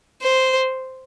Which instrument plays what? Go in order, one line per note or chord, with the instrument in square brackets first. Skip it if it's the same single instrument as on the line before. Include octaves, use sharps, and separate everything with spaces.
[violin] C5